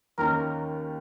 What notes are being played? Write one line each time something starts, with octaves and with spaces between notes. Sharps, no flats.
D#2 D#3 A#3 C#4 A#4